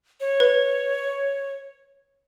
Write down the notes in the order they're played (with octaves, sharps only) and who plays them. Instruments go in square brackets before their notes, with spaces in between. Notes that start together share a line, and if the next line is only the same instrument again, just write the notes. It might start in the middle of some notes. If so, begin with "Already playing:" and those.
[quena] C#5
[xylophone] B4